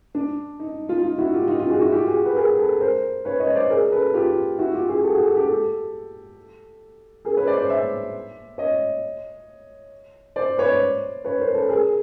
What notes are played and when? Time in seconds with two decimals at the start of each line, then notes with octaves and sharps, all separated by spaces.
0.15 D4
0.60 D#4
0.89 D#4 F4
1.03 D#4 F4
1.18 E4 F#4
1.34 F4 G4
1.47 D#4 F4
1.60 D#4 F4
1.70 F#4 G#4
1.81 E4 F#4
1.92 F4 G4
2.07 F#4 G#4
2.26 B4
2.37 G#4 A#4
2.59 A4 B4
2.81 A#4 C5
3.25 B4 C#5
3.40 C#5 D#5
3.55 C5 D5
3.70 G#4 A#4
3.92 A4 B4
4.14 F4 G4
4.59 E4 F#4
4.73 F4 G4
4.89 F#4 G#4
5.04 G4 A4
5.14 F#4 G#4
5.25 G4 A4
5.36 G4 A4
5.48 G4 A4
7.25 G#4 A#4
7.37 B4 C#5
7.47 C5 D5
7.58 C5 D5
7.70 D5 E5
8.58 C#5 D#5
10.36 C5 D5
10.58 B4 C#5
10.70 C5 D5
11.25 B4 C#5
11.40 A#4 C5
11.54 A4 B4
11.69 G#4 A#4